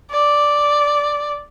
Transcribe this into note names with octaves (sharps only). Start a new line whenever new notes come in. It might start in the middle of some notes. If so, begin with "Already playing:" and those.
D5